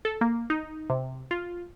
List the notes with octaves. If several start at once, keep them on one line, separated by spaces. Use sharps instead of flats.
A4
A#3
D#4
C3
F4